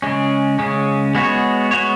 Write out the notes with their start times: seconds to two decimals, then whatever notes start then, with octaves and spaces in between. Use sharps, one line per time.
0.02 C#3 G#3 C#4
0.59 C#3 G#3 C#4
1.15 G#3 B3 F#4 C#5
1.71 G#3 B3 F#4 C#5